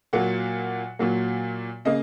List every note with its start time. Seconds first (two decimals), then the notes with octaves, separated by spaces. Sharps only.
0.13 A#2 F#3 A#3 F#5
0.99 A#2 F#3 A#3
1.85 C#3 A#3 D#5